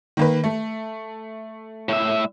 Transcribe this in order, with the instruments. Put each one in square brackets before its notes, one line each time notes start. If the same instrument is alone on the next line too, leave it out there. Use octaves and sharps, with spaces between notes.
[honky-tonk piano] D#3 A#3 B4
A3
[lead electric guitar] A2 E5